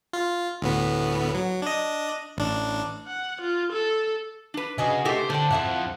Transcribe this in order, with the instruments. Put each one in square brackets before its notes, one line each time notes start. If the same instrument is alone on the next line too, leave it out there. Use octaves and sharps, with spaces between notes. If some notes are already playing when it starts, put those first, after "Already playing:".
[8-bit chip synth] F4
D2 A2 B3
F#3
D4 D#5
A1 D4
[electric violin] F#5
F4
A4
[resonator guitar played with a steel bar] D4 B4
[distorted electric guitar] C#3 [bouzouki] F#4 G#4 D#5
[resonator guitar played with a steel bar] A3 G4 A4 [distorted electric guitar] A#4 C5
[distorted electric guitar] D3 [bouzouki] D4 [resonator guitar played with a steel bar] C5 G5
[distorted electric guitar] F2 G#2 [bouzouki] F3 E4 F#5